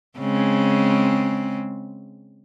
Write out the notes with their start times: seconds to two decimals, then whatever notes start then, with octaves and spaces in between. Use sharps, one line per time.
0.19 C#3 G#3 C4